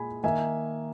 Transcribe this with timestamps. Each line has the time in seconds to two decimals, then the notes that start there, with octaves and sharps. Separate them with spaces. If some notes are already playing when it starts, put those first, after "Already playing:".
Already playing: A#2 G#3 G#5 B5
0.23 D#3 A#3 D#4 E5 G#5